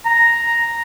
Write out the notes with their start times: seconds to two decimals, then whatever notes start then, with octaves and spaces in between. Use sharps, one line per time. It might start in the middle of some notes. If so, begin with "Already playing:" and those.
0.05 A#5